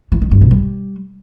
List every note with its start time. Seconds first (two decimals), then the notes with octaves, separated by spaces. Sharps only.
0.12 E3
0.22 D#3
0.31 G2
0.41 B2
0.51 G3